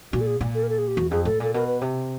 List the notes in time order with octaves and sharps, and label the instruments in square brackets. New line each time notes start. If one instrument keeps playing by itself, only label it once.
[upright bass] A#2 [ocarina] F#4
[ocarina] A4
G#4
[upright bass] A#2
[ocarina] A4
A#4
A4
G#4
G4
[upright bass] E2 [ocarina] F#4
[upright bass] F2 [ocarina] G#4
[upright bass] A2 [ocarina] A4
[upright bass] A#2 [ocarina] A4
[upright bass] B2 [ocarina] A#4
[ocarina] B4
[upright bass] C3